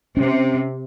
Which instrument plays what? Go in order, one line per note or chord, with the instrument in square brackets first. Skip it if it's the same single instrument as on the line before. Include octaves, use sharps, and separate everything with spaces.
[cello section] C3 [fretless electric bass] C#4